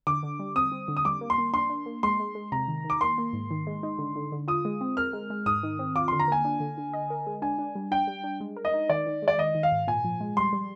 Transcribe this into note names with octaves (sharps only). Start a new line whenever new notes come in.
D3 D6
D3
G3
C4 D#6
C4
D3
D#6
G3 D6
A#3
C6
A#3
D4 C6
D4
A#3
G#3 C6
G#3
G#3
C3 A#5
D#3
D#3
D6
A#3 C6
A#3
G#2
D#3
G#3
D#4
D3
D3
D3
F4 D#6
G#3
C4
A#4 F6
G#3
G#3
G#2 D#6
D#3
C4
F4 D6
D3 C6
A#5
A#3 G#5
D4
D3
D3
D#5
A#4
G#3
D4 G#5
D4
G3
D4 G5
G3
D4
G#3
A#4
D#5
D#4
D#3 D5
D#3
G#3
D5
D#3 D#5
D#3
F5
G#2
A#2 G#5
F3
G#3
G3 C6
G3